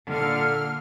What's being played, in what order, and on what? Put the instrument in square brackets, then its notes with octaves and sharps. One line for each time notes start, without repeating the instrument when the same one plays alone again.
[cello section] A#2 D3 F5 [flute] A4 [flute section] F6